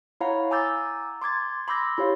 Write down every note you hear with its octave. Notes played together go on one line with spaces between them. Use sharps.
E4 C#5 F5 F#5 A#5
G#5 A#5 D6 E6 G6 A6
C6 D6 G#6 A6
B5 C6 D6 E6 G6 A#6
E4 G4 C#5 F5